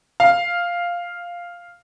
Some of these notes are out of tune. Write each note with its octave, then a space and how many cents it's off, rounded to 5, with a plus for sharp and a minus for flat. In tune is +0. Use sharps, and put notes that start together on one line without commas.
F5 +0